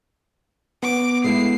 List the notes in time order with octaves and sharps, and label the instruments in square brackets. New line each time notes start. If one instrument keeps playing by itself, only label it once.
[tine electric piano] B3 [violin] D6
[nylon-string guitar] G#3 A3 E4 [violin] C7